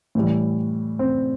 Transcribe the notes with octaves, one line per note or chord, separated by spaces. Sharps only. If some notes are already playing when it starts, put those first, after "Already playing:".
A2 E3 G3
C4